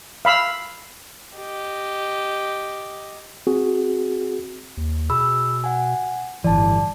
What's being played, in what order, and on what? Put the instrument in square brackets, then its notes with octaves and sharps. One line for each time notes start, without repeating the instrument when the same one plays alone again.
[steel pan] F5 B5 E6
[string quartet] G4 D#5
[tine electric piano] C4 F#4 G#4
[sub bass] D#2
[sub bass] B2 [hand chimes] G#4 B5 E6
[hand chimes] F#5 G#5
[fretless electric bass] G1 E3 [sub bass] A2 [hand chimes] D5 A5